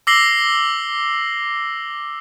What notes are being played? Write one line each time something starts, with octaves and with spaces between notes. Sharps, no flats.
D6 E6 A#6 C7 F#7 G7